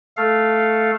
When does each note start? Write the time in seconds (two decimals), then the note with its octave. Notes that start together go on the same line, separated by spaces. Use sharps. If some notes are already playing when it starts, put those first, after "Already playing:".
0.17 A3 A4 F5